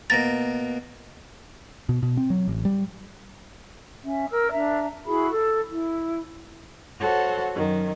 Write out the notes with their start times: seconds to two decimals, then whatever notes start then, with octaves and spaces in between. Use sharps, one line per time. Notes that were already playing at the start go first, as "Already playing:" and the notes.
0.10 B2 A#3 A#5 A6 A#6
1.89 B2
2.03 B2
2.17 C4
2.30 F#3
2.48 A1
2.65 G3
4.04 C#4 E5
4.29 A#4 E6
4.51 D4 E5 A#5
5.05 E4 F#4 G#4 B5
5.29 A4
5.70 E4
7.00 F#4 A4 C5 C#5 F#5
7.54 F#2 D#3